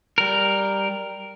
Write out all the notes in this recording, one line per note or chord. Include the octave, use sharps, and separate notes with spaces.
G3 A#4